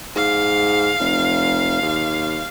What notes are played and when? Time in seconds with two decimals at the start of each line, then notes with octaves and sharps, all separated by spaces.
0.16 G#2 F5
0.99 F1
1.82 D#2